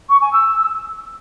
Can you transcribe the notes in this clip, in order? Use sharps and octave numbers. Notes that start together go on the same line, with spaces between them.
C#6
G#5
E6